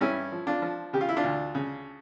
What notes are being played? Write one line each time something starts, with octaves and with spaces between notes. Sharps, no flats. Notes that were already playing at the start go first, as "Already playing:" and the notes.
G2 C#4 E4
F3
D4 F4
F3
C#3 G4
F4
E4
D4 F4
D2
C#3